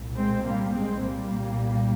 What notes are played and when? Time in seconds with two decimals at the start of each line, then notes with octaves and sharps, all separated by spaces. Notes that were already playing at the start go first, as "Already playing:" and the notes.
Already playing: C2 A#2
0.15 G#3 C4
0.44 G3 A#3
0.73 G#3 C4
1.02 C2 A#2 G3 A#3